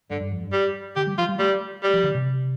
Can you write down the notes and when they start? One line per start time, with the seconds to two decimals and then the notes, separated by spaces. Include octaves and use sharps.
0.10 G2 D3
0.21 G2
0.31 F2
0.43 G2
0.53 G3
0.96 D3 G4
1.07 G3
1.18 F3 F4
1.29 G3
1.39 G3 A3
1.83 G3
1.93 F3
2.03 D3
2.14 C3